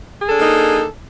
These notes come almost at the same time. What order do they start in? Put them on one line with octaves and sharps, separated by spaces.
G#4 A4 D4 A#3 D#4